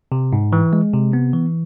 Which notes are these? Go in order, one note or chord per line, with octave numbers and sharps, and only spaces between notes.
C3
G#2
E3
G#3
C3
B3
E3